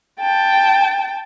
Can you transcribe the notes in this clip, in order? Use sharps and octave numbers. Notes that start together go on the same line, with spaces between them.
G5 A5